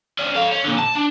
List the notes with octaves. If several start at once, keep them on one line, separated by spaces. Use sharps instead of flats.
C#4 D4
A4 F5
C#4
A#2 D3
A5
D4